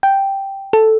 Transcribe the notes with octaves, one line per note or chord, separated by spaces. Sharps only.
G5
A4